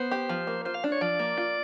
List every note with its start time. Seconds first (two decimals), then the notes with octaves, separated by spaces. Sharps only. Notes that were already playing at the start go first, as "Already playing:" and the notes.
Already playing: B3 C5
0.12 G4
0.29 F3
0.47 A#3
0.65 F4 C5
0.74 F5
0.84 D4
0.92 C#5
1.01 F3 D5
1.19 A#3
1.37 F4